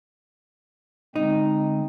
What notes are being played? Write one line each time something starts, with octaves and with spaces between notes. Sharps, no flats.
D3 G#3 C4 D#4